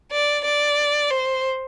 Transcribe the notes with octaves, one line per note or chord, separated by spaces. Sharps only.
D5
D5
C5